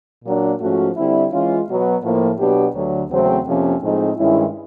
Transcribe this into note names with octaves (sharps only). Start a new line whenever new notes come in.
A#2 F#3 A#3 D4
G#2 F3 A3 C#4 F#4
D3 G3 C4 E4
E3 G#3 C#4 F4
B2 F#3 B3
A2 F3 A#3
B2 F#3 B3 D4 G4
D2 D3 F#3
E2 C#3 F#3 A3 C4
F2 C3 F3 A#3 C#4
A2 F3 G#3 C4 D#4
G2 D#3 G#3 C#4 E4